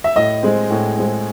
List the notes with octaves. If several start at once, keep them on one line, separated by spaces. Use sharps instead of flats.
E5
A2 D#5
G#3 C4
A2
G#3 C4